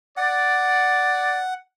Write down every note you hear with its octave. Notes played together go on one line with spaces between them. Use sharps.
D5 F#5